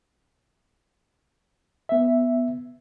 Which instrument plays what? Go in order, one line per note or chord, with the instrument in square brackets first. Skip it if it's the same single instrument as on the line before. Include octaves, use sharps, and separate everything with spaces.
[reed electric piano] B3 E5